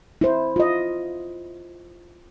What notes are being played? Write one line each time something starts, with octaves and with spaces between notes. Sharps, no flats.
E4 C5
F4 D#5